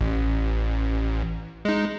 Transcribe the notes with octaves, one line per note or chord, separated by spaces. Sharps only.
A1
G#3 D#4